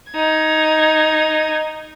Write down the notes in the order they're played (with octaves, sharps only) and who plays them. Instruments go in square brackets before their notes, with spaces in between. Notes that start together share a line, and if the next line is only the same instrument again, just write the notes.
[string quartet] D#4 G#6